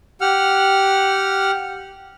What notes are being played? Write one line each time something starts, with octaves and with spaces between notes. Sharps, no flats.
G4 F#5 F6